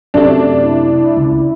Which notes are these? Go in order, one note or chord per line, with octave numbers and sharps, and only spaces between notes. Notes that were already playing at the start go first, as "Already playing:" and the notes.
F#2 C3 A3 D4
E4
C#2 E4